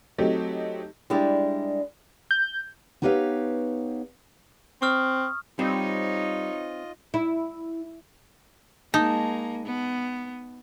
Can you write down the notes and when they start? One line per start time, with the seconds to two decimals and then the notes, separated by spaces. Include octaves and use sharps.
0.18 F#3 A3 C4 D#4 G4
1.10 G3 G#3 D4 E4 G4 G#4
2.31 G6
3.02 B3 D#4 G4 B4 C#5 F5
4.82 C4 C#6 D#6 F6
5.59 G3 C4 D#4 F4 C#5 D#5
7.14 E4
8.94 G#3 A#3 D#4 A5
9.66 B3